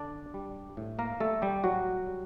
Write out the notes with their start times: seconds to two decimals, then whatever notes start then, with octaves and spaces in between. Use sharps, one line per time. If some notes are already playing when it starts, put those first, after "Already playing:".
Already playing: D3 D4 D5
0.34 G3
0.77 A2
0.99 A#3 A#4
1.20 G3 A3 A4
1.42 G3 G4
1.64 A2 F#3 F#4
2.06 G3